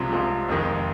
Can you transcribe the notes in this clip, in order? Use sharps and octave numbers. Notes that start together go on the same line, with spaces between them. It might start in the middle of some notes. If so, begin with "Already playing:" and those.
Already playing: C2 C3 F3 G#3
C2 C3 F3 G#3
F1 F2 D#3 G#3